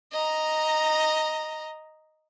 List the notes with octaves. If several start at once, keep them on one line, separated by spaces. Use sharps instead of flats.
D#5 A#5